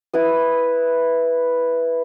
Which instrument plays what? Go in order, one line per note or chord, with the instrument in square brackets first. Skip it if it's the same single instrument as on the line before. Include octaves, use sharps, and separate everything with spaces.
[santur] E4 B4 D#6